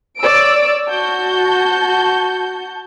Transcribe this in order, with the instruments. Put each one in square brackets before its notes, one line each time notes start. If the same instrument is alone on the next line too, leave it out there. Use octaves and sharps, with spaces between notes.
[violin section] C#5 D5 E6 D7
F#4 A5 G6